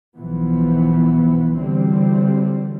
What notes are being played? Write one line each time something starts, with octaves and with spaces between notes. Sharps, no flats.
B1 E3 F3 B3
D3 E3 F#3 G3 C4